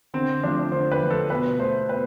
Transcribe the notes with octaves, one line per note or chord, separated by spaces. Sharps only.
D3 C4
F3 A3 D4
D3 C5
B4
F3 A3
A4
B2 B4
A3 C5
B2 B4